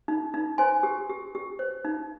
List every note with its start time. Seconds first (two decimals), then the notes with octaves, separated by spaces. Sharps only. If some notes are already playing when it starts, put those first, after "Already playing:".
0.08 D#4
0.34 D#4
0.58 C5 G#5 C6
0.83 G4
1.10 G4
1.35 G4
1.59 C5
1.85 D#4